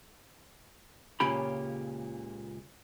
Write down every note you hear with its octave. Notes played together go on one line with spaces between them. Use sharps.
C#2 A#2 C#3 C#4 G4 B5